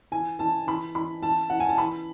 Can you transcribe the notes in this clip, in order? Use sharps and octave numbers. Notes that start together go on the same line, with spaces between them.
E3 G#5
E3 A5
E3 B5
E3 B5
E3 A5
E3 F#5
G#5
A5
E3 B5